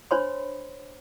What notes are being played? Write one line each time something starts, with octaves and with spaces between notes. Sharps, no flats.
D4 C5 C#5 B5 C6